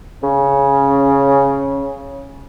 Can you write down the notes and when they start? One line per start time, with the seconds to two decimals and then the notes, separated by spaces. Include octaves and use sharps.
0.23 C#3 C#4